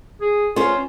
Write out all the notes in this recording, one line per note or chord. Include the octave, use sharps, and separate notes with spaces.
G#4
C#4 F4 C5